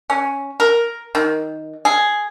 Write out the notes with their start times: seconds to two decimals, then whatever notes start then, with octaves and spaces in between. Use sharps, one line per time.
0.10 C#4
0.60 A#4
1.15 D#3
1.85 G#4